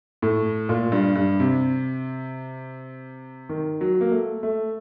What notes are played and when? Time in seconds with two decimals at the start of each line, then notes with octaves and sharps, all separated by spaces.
0.22 A2
0.69 A#2
0.92 G2
1.16 G2
1.40 C3
3.49 D#3
3.81 F#3
4.01 A#3
4.11 A3
4.43 A3